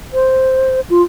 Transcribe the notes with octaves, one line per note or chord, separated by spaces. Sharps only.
C5
F4